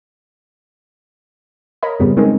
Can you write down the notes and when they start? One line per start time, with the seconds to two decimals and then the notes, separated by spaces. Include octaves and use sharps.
1.83 A#4 C#5 D#5 B5
2.00 F2 G#2 C#3 G3 B3
2.17 G#3 C4 C#4 D#4 A#4